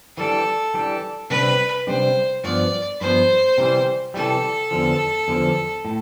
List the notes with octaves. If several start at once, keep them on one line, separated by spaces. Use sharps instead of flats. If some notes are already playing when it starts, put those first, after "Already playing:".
E3 G3 D4 A4
E3 G3 D4
C3 G3 D4 B4
C3 G3 D4 C5
G2 F3 B3 D5
G2 F3 B3 C5
C3 E3 G3
C3 E3 G3 A4
E2 D3 F3
E2 D3 F3
A2